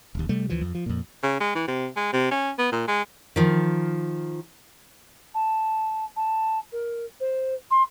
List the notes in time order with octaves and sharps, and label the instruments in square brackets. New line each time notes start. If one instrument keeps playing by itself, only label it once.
[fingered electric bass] D#1 D#2
C3 G3 A3
D2 E3 F3
F2
F3
F2 A#2
[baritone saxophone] C#3
G#3
E3
C3
G#3
C3
C#4
B3
A#2
G#3
[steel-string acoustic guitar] D#3 F3
[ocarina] A5
A5
A#4
C5
C6